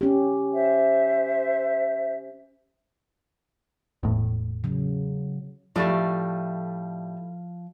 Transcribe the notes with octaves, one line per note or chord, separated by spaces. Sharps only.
C#4 G4
C5 E5
E1 A2
C#3 F#3
A2 F3 G3 A3 D5